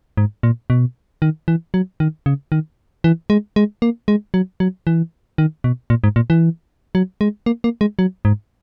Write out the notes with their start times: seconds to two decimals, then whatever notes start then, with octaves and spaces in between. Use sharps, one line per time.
0.17 G#2
0.43 A#2
0.70 B2
1.22 D#3
1.48 E3
1.74 F#3
2.00 D#3
2.26 C#3
2.52 D#3
3.04 E3
3.30 G#3
3.56 G#3
3.82 A#3
4.08 G#3
4.34 F#3
4.60 F#3
4.87 E3
5.38 D#3
5.64 B2
5.90 A#2
6.04 G#2
6.16 A#2
6.30 E3
6.95 F#3
7.21 G#3
7.46 A#3
7.64 A#3
7.81 G#3
7.99 F#3
8.25 G#2